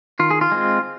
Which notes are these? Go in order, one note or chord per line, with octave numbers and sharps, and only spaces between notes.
D#3 F4
G#4
F4
G#3 C4